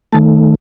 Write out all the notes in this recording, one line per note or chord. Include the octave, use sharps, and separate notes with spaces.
D#3 A3 A5